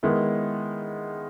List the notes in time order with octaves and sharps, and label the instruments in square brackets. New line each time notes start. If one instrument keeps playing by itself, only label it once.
[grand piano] D#3 G#3 B3 E4